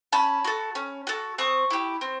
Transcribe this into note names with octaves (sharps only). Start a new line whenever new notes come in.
C#4 A5 B5
F#4 A4
C#4
F#4 A4
C4 C#6 D#6
E4 G4
C4